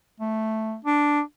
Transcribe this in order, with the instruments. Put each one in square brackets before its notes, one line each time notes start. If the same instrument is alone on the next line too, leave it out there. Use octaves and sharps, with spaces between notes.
[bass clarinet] A3
D4